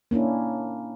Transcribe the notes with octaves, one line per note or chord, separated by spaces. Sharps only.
A#3 C#4 D4 E4